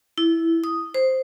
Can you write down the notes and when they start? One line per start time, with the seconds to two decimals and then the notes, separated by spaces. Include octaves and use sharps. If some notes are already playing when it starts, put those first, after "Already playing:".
0.18 E4
0.64 D#6
0.94 C5